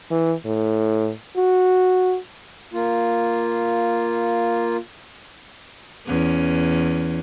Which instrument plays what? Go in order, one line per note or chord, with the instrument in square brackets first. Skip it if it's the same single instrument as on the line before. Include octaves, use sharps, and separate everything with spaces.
[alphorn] E3
A2
F#4
[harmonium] A#3 F4
[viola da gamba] E2 C#4